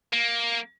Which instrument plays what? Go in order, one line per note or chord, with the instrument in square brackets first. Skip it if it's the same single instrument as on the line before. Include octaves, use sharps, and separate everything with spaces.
[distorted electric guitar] A#3